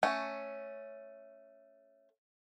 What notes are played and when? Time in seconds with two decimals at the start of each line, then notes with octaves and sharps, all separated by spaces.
0.03 A3 C#4